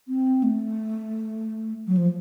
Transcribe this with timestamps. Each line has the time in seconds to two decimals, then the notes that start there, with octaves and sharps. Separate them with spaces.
0.08 C4
0.43 A3
1.87 F#3
1.97 F3